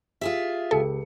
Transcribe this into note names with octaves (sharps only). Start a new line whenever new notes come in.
F4 G4 G#4 E5
C#2 G4 A4 C#7